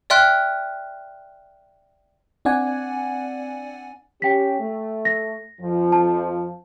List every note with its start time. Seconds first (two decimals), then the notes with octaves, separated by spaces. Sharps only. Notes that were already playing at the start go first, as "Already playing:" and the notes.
0.10 D5 E5 G5 C6 F6 F#6
2.45 C4 D4 D5 F#5 G#5
4.22 C#4 G4 G5 B6
4.60 A3
5.05 A#6
5.61 F2 F3
5.92 A5